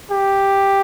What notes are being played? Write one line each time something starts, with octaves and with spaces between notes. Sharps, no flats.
G4